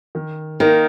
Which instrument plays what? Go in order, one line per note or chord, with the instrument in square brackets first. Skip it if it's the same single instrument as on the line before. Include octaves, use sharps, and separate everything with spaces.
[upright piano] D#3
[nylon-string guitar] D#3 [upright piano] A#3 D#4 A#4